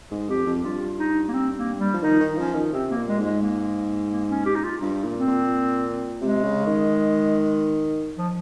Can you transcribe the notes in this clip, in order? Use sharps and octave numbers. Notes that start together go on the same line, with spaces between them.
G#2
F2 G4
F2
G2 F4
D#4
A#3
C4
A#3
G3
F3
D#3 D#4
D#3
F3 C#4
D#3
C3 C4
A#3
A#2
G#3
G#2
G#3
A#3
A#3
C#4
G4
D#4
F4
G2
A#2
C4
A#2
C3 G#3
C#3
D#3
F3